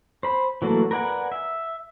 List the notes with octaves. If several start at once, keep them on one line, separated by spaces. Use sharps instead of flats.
C5 B5
E3 F#3 A3 A#3
A#4 B4 D5 F#5 G#5
E5